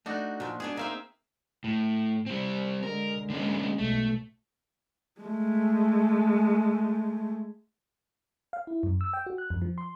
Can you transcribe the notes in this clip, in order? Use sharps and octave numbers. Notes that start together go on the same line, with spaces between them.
A3 D4 D#4 F#4
A#2 F3
G#3 B3 D4 G#4
A#3 C4 D#4 E5 F5
A2
G3 C4
D3 G#3 A#4
D3 G#3 A#3 C#4
B1 A3
G#3 A3
F5
E4
F#2
E6
G5
F#4
F#6
F2
F3
C6